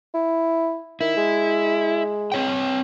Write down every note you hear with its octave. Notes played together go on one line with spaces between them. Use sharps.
E4
D#3 E4
G#3
C4 C#5 G5